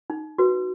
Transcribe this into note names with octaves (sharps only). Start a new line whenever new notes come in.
D#4
F#4 B4